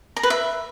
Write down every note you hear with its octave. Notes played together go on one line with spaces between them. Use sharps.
A#5
B4
E5